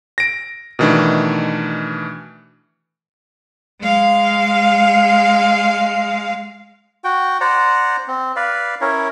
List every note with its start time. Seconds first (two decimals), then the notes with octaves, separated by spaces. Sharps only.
0.18 A#6 D7
0.79 B2 D#3 E3 A3 D4
3.81 G#3 F5
7.04 F#4 G5
7.41 C5 D5 F#5 A#5
8.08 C4
8.36 B4 D5 F5
8.81 C#4 E4 A#4 C#5